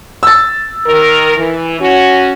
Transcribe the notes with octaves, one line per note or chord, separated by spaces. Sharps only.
E6 A6
D#3 A#4
E3
C#4 F#4